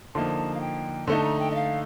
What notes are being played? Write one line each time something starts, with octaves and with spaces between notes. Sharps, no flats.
D3 F3 A#3 D#4 A5
F5
G5
D3 A3 D#4 A5
A#5
G5
D#5
F5